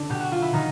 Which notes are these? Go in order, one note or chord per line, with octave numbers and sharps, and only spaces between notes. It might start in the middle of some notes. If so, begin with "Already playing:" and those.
Already playing: D3 D4
B2 G4
F#4
F4
E4
B2 D#3 D#4